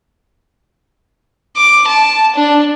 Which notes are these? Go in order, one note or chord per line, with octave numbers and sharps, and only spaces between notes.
D6
A5
D4